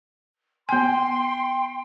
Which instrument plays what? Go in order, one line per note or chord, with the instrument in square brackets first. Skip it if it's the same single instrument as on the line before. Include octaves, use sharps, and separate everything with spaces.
[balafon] B3 G#5 [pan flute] G5 [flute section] C6